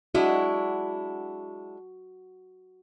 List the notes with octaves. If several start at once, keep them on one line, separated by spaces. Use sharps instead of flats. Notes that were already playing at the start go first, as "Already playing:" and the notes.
G#3 D4 E4 F#4